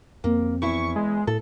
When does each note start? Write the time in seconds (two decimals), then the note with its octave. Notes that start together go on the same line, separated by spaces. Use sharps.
0.24 F2 A#3 C4
0.62 E2 E4 C#6
0.96 G#3
1.27 A2 A4